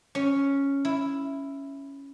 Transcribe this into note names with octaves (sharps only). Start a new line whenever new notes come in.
C#4
E4